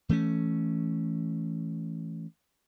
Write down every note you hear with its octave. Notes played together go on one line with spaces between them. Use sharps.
E3 A3 A#3 C#4